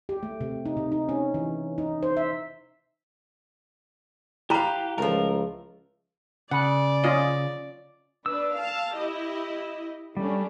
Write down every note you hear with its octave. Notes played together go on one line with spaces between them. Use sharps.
G4
A3
C3
D#4
C3
D#4
C#4
E3
D#4
C5
E5
E4 G4 B4 F5 A#5
C#2 F3 A3 A#4
C#3 D5 F#5
C#4 F4 D#5
D4 B4 E6
F5 A5
E4 G4 D#5
G3 A3 C#4 D4